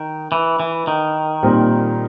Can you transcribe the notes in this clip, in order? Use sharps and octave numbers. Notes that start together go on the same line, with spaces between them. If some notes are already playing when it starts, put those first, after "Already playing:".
Already playing: D#3
E3
E3
D#3
A#2 G3 C4 D#4